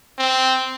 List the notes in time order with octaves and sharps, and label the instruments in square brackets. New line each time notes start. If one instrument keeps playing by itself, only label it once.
[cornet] C4